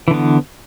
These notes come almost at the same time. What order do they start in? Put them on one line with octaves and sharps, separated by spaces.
E3 D3 B3